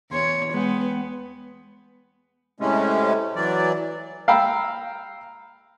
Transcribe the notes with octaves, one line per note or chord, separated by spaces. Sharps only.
E2 C#5 C6
G#3 B3 G5
A2 C3 G#3 A3 C#4
E3 F#3 D5
F5 G5 A#5 B5 E6